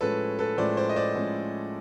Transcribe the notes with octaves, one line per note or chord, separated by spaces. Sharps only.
A2 F3 G#3 C#4 A4 B4
A4 B4
A2 F3 G#3 C#4 C5 D5
C5 D5
D#5
C5 D5
A2 F3 G#3 C#4